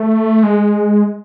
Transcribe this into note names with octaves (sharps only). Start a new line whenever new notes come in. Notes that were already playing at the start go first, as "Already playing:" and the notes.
Already playing: A3
G#3